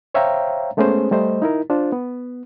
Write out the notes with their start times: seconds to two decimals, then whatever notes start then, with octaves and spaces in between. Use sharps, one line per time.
0.14 C5 C#5 E5 F5 G5 A#5
0.77 G#3 A3 B3 C#4 G#4 C5
1.11 G3 A3 C5 D#5
1.42 D#4 E4 A#4
1.70 D4 F4 C5
1.92 B3